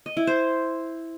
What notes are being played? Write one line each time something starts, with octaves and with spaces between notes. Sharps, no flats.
D#5
E4
C5